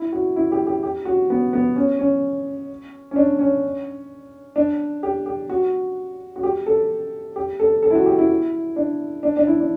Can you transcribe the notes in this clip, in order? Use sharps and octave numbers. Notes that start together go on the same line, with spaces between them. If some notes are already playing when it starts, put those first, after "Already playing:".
Already playing: E4
F#4
E4
G4
G4
G4
F#4
B3
B3
C#4
C#4
C#4
D4
C#4
D4
G4
G4
F#4
F#4
G4
A4
G4
A4
A4
E4
F#4
G4
E4
D4
D4
D4
E4
D4